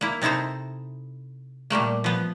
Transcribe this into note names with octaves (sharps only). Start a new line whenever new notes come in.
A#3 E4
C3 D#4 E4 A4 C5
A#2 G3 A3 A#3
F3 B3